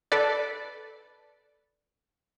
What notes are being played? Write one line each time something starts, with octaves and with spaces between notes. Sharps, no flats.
A4 B4 D5